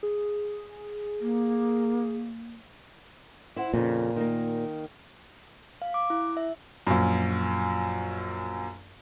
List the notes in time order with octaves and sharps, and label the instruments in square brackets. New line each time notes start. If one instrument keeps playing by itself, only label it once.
[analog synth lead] G#4
[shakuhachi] A#3
[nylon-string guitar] E4 C5 F#5
[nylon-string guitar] F2 C#3 [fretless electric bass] A#2
[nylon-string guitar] D#3 A#3
[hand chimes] F5
D6
E4
E5
[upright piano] A#1 F#2